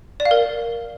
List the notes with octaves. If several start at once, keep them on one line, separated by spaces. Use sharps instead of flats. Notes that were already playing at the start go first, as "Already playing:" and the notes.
D5
F5
A#4